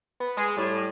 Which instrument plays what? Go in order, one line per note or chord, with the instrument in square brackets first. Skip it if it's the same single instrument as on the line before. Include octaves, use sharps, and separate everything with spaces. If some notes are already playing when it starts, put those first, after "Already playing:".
[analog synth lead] B3
[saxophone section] G#3 [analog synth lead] G#4
[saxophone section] A2 [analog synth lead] G3